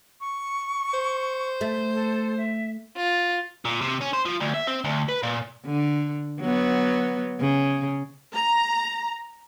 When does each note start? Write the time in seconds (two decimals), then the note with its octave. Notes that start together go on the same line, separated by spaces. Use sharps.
0.21 C#6
0.93 C5
1.61 A3
1.94 A4
2.37 E5
2.97 F4
3.65 A#2
3.81 C3
4.01 C#4
4.13 C5
4.26 F3
4.41 D2
4.54 E5
4.67 C4
4.84 D2
5.08 B4
5.23 A#2
5.65 D3
6.41 F#3 B3
7.40 C#3
8.35 A#5